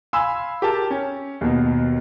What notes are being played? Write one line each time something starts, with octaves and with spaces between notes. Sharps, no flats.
F5 G#5 B5 C6 E6
G4 A#4 A5
C#4
D#2 B2